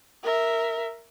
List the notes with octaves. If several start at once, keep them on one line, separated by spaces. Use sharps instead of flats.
A#4 E5